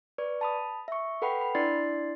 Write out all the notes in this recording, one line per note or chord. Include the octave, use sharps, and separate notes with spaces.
B4 D5 C#6
A5 B5 D#6
E5 C#6
A4 B4 F#5 G5 B5
B5
D4 E4 D5 C6 A6 C7